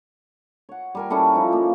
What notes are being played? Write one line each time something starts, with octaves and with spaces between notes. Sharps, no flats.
C#5 F#5
G3 A#4 G#5
G3 C#4 E4 A4
F3 D#4
A#3